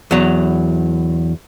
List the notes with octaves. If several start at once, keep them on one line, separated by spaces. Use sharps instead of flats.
E2 F#3